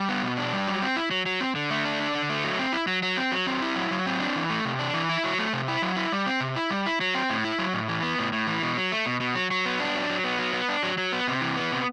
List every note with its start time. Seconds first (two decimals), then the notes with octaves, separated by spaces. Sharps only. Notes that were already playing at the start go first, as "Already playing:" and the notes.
Already playing: G3
0.09 B3
0.23 B2
0.37 D4
0.53 G3
0.68 F#3
0.82 C4
0.96 E4
1.11 F#3
1.26 F#3
1.41 C4
1.55 D3
1.71 A3
1.85 D4
2.00 D3
2.15 D3
2.30 A3
2.44 F#3
2.59 C4
2.73 E4
2.87 F#3
3.03 F#3
3.17 C4
3.32 F#3
3.47 C4
3.62 E4
3.76 F#3
3.91 F#3
4.06 C4
4.20 D4
4.36 E3
4.50 A3
4.65 C3
4.79 D4
4.94 E3
5.09 E4
5.24 F#3
5.39 A3
5.53 C3
5.68 E4
5.82 F#3
5.96 E4
6.12 G3
6.26 C4
6.41 C3
6.56 E4
6.71 G3
6.86 E4
7.01 F#3
7.15 C4
7.30 A2
7.44 E4
7.59 F#3
7.73 A2
7.88 E3
8.03 B3
8.19 A2
8.33 A2
8.47 E3
8.63 B2
8.77 F#3
8.92 A3
9.06 B2
9.20 B2
9.35 F#3
9.51 F#3
9.65 B3
9.80 D4
9.95 F#3
10.10 F#3
10.24 B3
10.39 F#3
10.53 B3
10.69 D4
10.83 F#3
10.98 F#3
11.12 B3
11.28 C3
11.41 E3
11.56 B3
11.72 C3